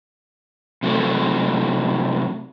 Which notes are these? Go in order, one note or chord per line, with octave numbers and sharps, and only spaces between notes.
C3 F#3 A3